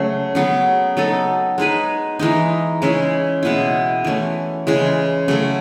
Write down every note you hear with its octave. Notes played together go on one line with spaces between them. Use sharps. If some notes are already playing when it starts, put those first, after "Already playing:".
Already playing: C#3 F#3 A3
C#3 F#3 B3
F#3 B3 D#4 A4
G#3 D#4 G#4 B4
E3 G#3 D#4
C#3 G#3 C#4 E4
B2 G#3 B3 E4
E3 A3 C#4
C#3 E3 G#3
C#3 F#3 A3